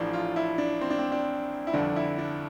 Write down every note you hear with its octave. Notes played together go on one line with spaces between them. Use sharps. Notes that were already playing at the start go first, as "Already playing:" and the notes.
Already playing: A1 A2 F3 D4
F4
E4
D4
C4
D4
C4
D4
E4
G1 F2 D3 D4
E4
D4